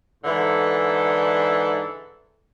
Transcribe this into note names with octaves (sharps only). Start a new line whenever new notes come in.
G#2 D3 E3 A4